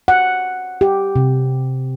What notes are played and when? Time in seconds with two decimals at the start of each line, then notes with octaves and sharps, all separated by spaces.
0.08 F#5
0.81 G4
1.16 C3